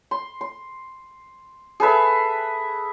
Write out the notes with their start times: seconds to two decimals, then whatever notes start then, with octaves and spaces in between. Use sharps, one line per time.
0.11 C6
0.41 C6
1.80 G#4 A4 B4 E5